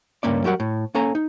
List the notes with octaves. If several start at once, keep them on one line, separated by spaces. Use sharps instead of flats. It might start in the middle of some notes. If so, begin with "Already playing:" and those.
C#2 G2 A#3 C#4 D5
F#3 G3 F#4 A#4 F#5
A2
A#3 C#4 A4 G#5 A#5
D#4